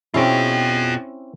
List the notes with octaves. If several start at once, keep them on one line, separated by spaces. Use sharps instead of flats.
B2 C4 C#4 E4 F4 G#4 G5